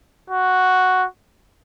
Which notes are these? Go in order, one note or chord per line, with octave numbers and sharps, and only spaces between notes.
F#4